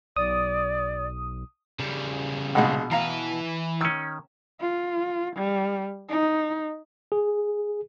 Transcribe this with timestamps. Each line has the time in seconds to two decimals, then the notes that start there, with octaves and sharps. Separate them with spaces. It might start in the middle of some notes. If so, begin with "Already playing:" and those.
0.16 B1 D5 D#6
1.79 C#3 G3
2.55 A#1 B2 G#3 F#5
2.91 E3 B4 F5 A#5
3.81 D#3 C#4 E6
4.61 F4
5.36 G3
6.09 D#4
7.12 G#4